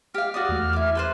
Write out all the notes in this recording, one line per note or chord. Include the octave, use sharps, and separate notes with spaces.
G4 F5 F6
F#4 D5 D#6
E2 A3
E4 D6
A4 B4 C5